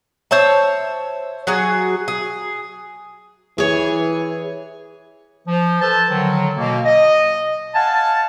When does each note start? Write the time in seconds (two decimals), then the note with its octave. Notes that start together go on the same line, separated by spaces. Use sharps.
0.31 C5 C#5 E5 A5
1.47 F#3 F#4 G#4
2.08 G#4
3.58 E3 G#4 C#5
5.48 F3
5.81 A4 B4 C5 A5
6.10 D3 D#3 F#3
6.57 B2 A#3
6.85 D#5
7.74 F5 F#5 G#5 A5